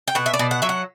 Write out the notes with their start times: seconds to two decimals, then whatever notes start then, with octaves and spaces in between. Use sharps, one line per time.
0.08 G5
0.15 B2 F#5
0.26 E5
0.33 D5
0.39 B2
0.51 F#5
0.62 F#3 E5
0.69 F#5